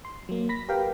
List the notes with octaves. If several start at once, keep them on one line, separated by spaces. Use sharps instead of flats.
C6
F#3 A#3
B5 A#6 B6
G4 A#4 B4 F5 G5